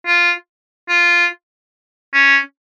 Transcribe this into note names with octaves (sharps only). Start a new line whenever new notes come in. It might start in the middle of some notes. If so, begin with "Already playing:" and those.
F4
F4
C#4